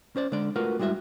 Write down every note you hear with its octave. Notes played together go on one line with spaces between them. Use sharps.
C#4 C5 D5
D3 G#3 D5
A3 F4 F#4 A#4 B4
G3 G#3 E4 F#4 E5